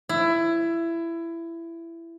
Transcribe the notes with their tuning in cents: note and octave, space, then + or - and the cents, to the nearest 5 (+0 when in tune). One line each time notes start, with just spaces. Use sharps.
E4 +20